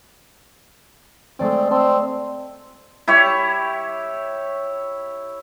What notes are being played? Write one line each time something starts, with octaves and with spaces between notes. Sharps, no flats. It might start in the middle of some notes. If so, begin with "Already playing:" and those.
G#3 A3 C4 D5
C4 A5 C6 E6
E4 G4 C#5